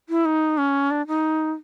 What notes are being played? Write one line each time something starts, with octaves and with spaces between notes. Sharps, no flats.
E4
D#4
C#4
D4
D#4